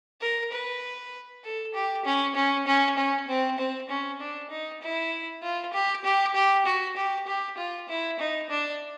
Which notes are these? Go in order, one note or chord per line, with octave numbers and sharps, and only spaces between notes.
A#4
B4
A4
G4
C#4
C#4
C#4
C#4
C4
C4
C#4
D4
D#4
E4
F4
G4
G4
G4
F#4
G4
G4
F4
E4
D#4
D4